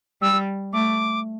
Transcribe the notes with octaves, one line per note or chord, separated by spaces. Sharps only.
G3 E6
A3 D6